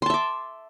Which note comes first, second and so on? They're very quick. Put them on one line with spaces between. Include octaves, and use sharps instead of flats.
C6 A5 E5 D6